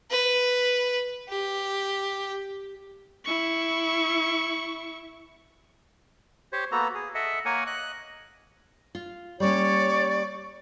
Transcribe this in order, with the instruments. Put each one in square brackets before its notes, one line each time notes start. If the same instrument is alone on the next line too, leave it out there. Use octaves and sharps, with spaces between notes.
[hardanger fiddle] B4
G4
[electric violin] E4 C#6
[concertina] G4 C5 C#5
A#3 B3 F#4 A4 A#5
G#4
A4 D#5 E5 F#5
A#3 A#4 C#5 F#5 G#5
D#5 F#6
[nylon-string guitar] F4
[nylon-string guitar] G3 A#3 C#4 [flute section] C#5 C#6 [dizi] D5